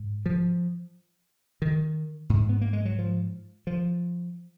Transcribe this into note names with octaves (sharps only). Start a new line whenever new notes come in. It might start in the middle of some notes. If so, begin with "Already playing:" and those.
Already playing: G#2
F3
D#3
G#2
B3
A#3
G#3
F#3
F3
F3